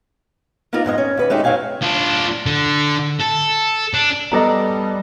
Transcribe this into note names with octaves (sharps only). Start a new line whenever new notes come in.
A#3 B3 D#4 F4 A#4
F2 G#2 G#3 D#5
C#4
D#2 B4
G#3 A3 C#4 D#4 G4
F#2 F#3 A3 C#5 F5 G#5
D4 F4
D3
A4
D4
G3 B3 A4 D#5 A#5 D6 D#6